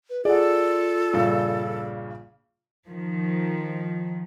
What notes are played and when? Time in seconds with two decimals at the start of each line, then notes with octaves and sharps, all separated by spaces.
0.10 B4
0.25 F4 G#4 A4 D5 F#5
1.13 A#1 G2 C#3
2.87 D#3 F3